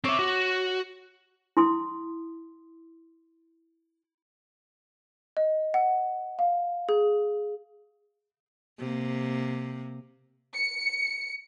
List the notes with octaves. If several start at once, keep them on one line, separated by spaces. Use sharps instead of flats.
C4 C#5 E5 D6
F#4
E4 C6 D#6
D#5
F#5
F5
G#4
C3 A#3
C#7